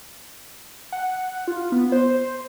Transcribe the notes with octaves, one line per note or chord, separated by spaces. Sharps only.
F#5
F4
B3
C5